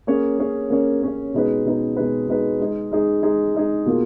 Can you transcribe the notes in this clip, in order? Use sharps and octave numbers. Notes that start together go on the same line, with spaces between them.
A#3 C#4 G#4 C#5
A#3 C#4 G#4 C#5
A#3 C#4 G#4 C#5
A#3 C#4 G#4 C#5
B2 G#3 D#4 G#4 B4
B2 G#3 D#4 G#4 B4
B2 G#3 D#4 G#4 B4
B2 G#3 D#4 G#4 B4
G#3 D#4 G#4
G#3 D#4 G#4
G#3 D#4 G#4
G#3 D#4 G#4
B2 A#3 F4 G#4